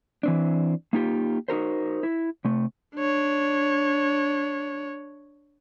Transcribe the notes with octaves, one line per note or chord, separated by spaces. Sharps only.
E3 C4 D4
A#3 D#4 F4 G4
D#4 F#4 A#4 C5
E4
C3 A3
D4 C#5